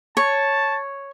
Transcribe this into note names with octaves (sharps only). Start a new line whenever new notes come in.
C#5 A5